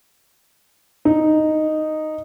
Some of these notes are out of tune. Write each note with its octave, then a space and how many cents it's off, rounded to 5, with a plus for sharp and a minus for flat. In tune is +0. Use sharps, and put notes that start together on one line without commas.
D#4 -5